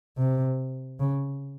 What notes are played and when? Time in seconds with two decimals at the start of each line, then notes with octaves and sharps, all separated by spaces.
0.18 C3
1.00 C#3